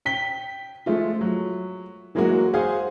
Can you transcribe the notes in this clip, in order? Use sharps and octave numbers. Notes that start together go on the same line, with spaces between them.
G5 B6 G7
F3 G#3 A3 F4
F#3
E3 F#3 G#3 A#3 F#4
G#4 C5 F5 F#5 G#5